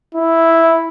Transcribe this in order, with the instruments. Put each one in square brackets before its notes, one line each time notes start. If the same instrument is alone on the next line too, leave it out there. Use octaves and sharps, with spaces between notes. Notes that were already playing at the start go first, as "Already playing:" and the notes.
[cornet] E4